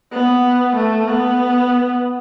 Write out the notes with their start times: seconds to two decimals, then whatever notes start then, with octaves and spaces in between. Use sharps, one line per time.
0.13 B3
0.76 A3
1.08 B3